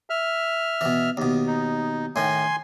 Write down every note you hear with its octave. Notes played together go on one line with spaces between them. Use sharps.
E5 F6
B2 E3
D#2 B2
D#4
A2 D#3 G#5 C6